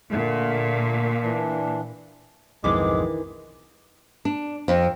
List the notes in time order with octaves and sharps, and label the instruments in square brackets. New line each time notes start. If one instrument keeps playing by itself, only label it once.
[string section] A#2 [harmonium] D3 A3
[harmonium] E3 D4
[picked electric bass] B1 F2 G#2 [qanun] D#3 E3 D4 [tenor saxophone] G#3 [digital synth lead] D6
[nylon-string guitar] D4
F2